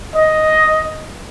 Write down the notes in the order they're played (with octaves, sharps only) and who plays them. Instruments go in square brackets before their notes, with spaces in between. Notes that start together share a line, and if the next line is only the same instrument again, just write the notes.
[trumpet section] D#5